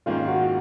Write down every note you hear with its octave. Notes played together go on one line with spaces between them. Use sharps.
G#2 D#3 A#3 C#4 F4 F5
F#4 F#5